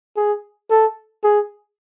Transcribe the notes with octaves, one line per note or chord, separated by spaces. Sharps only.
G#4
A4
G#4